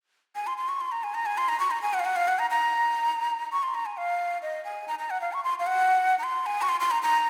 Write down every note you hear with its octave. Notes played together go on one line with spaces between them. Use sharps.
G#5
C6
C6
C#6
C6
A#5
G#5
A#5
G#5
C6
A#5
C#6
A#5
G#5
F#5
F5
F#5
F5
F#5
A#5
A#5
C#6
C6
A#5
G#5
F5
D#5
G#5
A#5
A#5
F#5
F5
C#6
C6
F5
F#5
A#5
C6
G#5
C#6
C6
C6
A#5
A#5